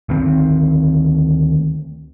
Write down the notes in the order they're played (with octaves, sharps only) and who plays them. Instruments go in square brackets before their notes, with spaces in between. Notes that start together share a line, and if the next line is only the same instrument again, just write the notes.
[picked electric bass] D2 D#3 C4